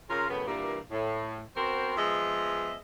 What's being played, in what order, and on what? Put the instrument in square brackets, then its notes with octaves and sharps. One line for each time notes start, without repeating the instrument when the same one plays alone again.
[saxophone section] C#3 F4 A#4
F#2 A2 C#3 B3
G2 A#2 E3 G3 A#3
A2
B3 C4 F#4 A#4 C5
F3 G#3 B3 G#4 D#5 E5